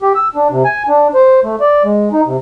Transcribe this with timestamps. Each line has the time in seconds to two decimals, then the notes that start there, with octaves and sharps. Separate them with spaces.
0.02 G4
0.15 E6
0.36 D4
0.51 C3
0.65 G#5
0.88 D4
1.14 C5
1.44 A3
1.61 D5
1.84 G#3
2.13 D#4
2.26 C3